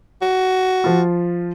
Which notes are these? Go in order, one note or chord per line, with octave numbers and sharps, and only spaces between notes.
F#4
F3 F4